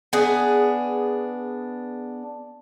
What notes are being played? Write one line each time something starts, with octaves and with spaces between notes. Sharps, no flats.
B3 D4 G#4